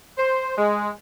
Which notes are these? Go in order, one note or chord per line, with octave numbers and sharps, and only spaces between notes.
C5
G#3